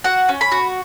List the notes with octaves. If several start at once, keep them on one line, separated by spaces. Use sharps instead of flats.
F#4 F#5
C#4
B5
F#4